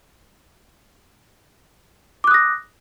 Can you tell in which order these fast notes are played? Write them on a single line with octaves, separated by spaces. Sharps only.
D6 F#6 D#6 A#6